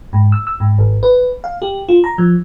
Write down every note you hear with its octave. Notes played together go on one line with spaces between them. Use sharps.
G#2
E6
E6
G#2
G#1
B4
F5
G4
F4
A#5
F3